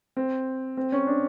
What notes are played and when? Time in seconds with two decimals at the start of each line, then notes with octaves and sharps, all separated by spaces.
0.17 C4
0.77 C4
0.92 C#4
1.07 D4